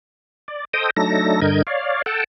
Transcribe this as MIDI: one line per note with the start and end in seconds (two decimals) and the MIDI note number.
0.48 0.65 74
0.73 0.90 69
0.73 0.90 72
0.73 0.90 75
0.73 0.90 79
0.73 0.90 87
0.97 1.40 54
0.97 1.40 57
0.97 1.40 62
0.97 1.40 63
0.97 1.40 69
0.97 1.40 94
1.42 1.62 43
1.42 1.62 50
1.42 1.62 70
1.42 1.62 75
1.42 1.62 91
1.42 1.62 92
1.67 2.02 73
1.67 2.02 74
1.67 2.02 77
2.06 2.24 69
2.06 2.24 78
2.06 2.24 79
2.06 2.24 81